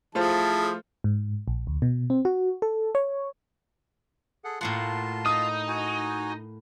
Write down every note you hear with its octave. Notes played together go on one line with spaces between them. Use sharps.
F3 A3 E4 F4 G#4 C5 A5
G#2
A#1
D2
B2
C4
F#4
A4
C#5
G#4 A4 F#5
A2 A#3 F4 F#5 A5 C6
D#4 D#6
F#4 G#5